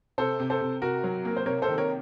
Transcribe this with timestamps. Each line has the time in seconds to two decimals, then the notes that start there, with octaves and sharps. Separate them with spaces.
0.18 C3 A4 C5
0.40 C3
0.50 A4 C5
0.61 C3
0.82 C3 F#4 A#4
1.04 F#3
1.25 A#3 A#4
1.37 C5
1.46 C3 A#4 C#5
1.62 A4 C5
1.68 D#3
1.78 A#4 C#5